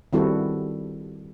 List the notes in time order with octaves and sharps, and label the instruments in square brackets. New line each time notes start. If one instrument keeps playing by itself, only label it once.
[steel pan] D#3 G3 C4 E4 F#4 A4